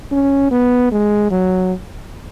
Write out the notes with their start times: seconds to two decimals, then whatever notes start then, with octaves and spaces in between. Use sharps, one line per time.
0.12 C#4
0.51 B3
0.92 G#3
1.31 F#3